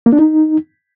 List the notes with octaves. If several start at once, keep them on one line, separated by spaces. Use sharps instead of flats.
A#3
D4
D#4